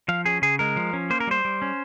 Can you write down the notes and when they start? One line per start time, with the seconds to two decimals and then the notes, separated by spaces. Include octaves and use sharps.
0.08 F3 F5
0.25 C#4 G#4
0.42 C#3 G#4
0.59 G#3 A#4
0.76 F3
0.93 C#4
1.10 A#3 C5
1.20 A#4
1.27 G3 C5
1.45 G3
1.62 C#4